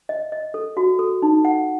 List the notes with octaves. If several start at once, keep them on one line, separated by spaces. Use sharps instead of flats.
D#5
D#5
A4
F#4
A4
D#4
F#5